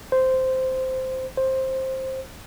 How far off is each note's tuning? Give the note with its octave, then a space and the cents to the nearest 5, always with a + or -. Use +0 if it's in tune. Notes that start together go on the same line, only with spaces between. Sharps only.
C5 -10
C5 +10